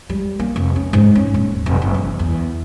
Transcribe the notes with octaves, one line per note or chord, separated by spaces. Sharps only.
G3
A#3
F1
C#4
G#2
C#4
D#1
F1
F#1
E2
E2